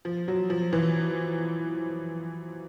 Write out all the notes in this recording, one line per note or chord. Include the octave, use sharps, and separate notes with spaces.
F3
F#3
F3
E3